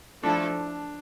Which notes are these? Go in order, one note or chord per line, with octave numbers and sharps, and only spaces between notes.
F3 A3 D4 E4 A4